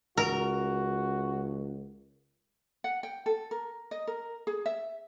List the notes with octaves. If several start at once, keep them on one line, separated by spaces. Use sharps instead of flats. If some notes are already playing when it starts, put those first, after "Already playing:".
C#2 F#4 A#4
F#5
G5
A4
A#4
D#5
A#4
G#4
E5